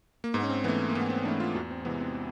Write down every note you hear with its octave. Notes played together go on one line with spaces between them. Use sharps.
A#3
G#2 B3
C#4
C4
E3 A3 B3
A#3
G#2 B3
C4
E3 A3 D4
F4
E2 F#4
C4
C3 E3 G#3 B3
C4